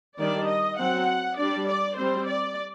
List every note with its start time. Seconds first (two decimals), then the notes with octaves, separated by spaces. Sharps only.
0.19 D#3 G3 D4 D5
0.48 D#5
0.78 F#3 C4 F#5
1.37 G3 D4 D5
1.67 D5
1.97 G3 C4 C5
2.26 D5